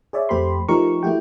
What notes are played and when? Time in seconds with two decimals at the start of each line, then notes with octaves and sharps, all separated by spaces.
0.13 G#4 C#5 D5 E5
0.29 F2 A3 G4 C5 B5 C6
0.68 F3 A3 D#4 G4 A#4 C#6
1.03 A3 E4 F#4 G4 G5